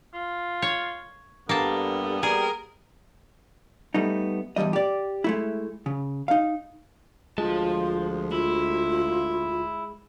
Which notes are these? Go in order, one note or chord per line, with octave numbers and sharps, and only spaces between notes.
F4
C#5
G2 G3 A#3 B3 A4 A5
G3 G#4 A#4
G3 A3 B3 D#4
E2 G2 D#3 G3 D#5
G4 D5
G#3 A3 E4
C#3
D#4 F5
D2 F3 G#3 F4 A5
E4 F4